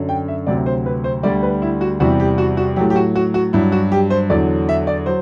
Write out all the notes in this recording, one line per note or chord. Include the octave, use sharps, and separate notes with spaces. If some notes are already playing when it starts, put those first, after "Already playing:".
Already playing: F#2 D3 F#3
G5
E5
D2 C3 F#3 D5
C5
B4
C5
D2 D3 G3 D5
B4
E4
F#4
E2 C3 G3 F#4
G4
F#4
F#4
A2 F#3 G4
G4
F#4
F#4
F#4
G2 F#3 E4
F#4
G4
C5
E2 D3 F#3 D5
E5
D5
F#3 C5